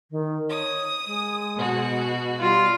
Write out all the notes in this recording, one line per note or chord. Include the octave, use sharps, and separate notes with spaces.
D#3
C#5 D#6
G#3
B2 F#4
G3 F4